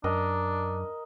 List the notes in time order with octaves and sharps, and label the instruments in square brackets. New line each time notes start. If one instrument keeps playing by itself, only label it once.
[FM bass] F#2 [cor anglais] D4 [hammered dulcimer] A#4 D#5 A#5